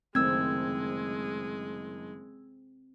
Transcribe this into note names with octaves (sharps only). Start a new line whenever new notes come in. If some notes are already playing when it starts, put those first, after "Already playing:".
F#1 D#3 G#3 A3 C4 E6 G#6